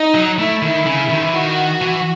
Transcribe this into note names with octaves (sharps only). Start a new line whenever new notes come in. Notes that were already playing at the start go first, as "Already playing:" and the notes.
Already playing: D#4
F#3
A3 E4
D#3
C#3
D#3
E3
D#3 F#4
E3